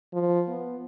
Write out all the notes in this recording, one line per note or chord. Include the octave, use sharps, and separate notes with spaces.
F3
B3